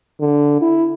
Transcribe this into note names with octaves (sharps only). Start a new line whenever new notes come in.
D3
E4